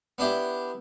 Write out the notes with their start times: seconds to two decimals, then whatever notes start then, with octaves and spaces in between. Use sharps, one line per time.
0.18 B3 D4 E4 G4